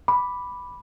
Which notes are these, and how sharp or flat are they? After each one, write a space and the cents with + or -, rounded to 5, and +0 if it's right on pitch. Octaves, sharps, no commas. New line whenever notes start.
B5 +0 D6 +0